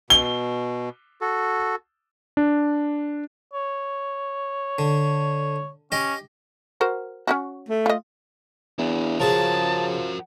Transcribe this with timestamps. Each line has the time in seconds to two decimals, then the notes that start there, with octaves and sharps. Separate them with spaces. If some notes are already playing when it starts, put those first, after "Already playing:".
0.10 B2 G7
1.21 F#4 A4
2.37 D4
3.53 C#5
4.79 D3
5.92 C#4 G4 D#5
6.81 F#4 A#4 C5
7.27 C#4 D#4 F#4
7.68 A3
7.86 F4 D#5
8.79 E2 D4 E4
9.20 C#3 F3 F#4 G#4 A#4 A5